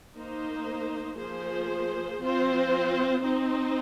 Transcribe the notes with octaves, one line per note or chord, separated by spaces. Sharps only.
A#3 D#4 C5
F3 A#3 G#4 C5
F3 C4 F4 C5
C4 D#4 C5